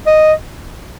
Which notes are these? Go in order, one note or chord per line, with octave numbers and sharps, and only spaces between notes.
D#5